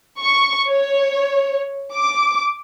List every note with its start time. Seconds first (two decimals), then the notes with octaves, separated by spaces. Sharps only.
0.21 C#6
0.67 C#5
1.94 D6